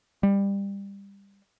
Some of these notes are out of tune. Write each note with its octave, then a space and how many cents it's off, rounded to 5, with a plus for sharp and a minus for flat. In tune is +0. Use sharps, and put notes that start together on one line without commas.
G3 +20